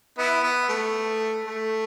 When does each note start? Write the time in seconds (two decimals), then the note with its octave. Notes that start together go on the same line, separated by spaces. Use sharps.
0.18 B3 E4
0.43 B3
0.69 A3
1.45 A3